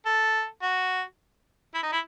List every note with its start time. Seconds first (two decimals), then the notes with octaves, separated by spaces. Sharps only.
0.06 A4
0.62 F#4
1.74 E4
1.83 D#4
1.92 E4